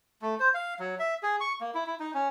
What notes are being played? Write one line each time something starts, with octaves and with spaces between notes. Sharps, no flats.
A3
C5
F5
F#3
E5
G#4
C#6
A#3
E4
E4
D#4
C#4